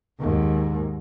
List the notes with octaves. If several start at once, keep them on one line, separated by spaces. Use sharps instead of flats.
D#2 G#2